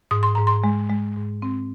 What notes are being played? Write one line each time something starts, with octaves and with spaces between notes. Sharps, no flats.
G#2 D#6
C6
G#2 A#5
C6
G#3
G#3
G#2
C4